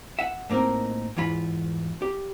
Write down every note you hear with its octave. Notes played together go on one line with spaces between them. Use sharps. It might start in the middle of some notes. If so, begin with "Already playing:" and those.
E5 F#5
A2 A#3 C4 D#4 A#4
E2 G#2 E3 F4 B5
G4